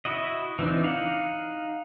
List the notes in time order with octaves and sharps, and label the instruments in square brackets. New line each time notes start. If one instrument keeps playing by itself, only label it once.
[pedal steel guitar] E4 F#4 D#5
E3 C4 D4 D#4
D#4 F5 F#5